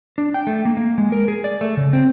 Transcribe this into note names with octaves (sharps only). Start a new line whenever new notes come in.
D4
G5
A3
A#3
A#3
G#3
A#4
G#4
D5
A3
C#3
C4